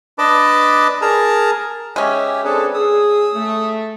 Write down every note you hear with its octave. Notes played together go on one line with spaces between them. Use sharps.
D4 B4 D#5 A5 D6
G#4 A#4 A5 A#5
G#3 C#4 G4 E5 G#5
C4 D4 G#4 A4 B4
G#4 D#6 E6
A3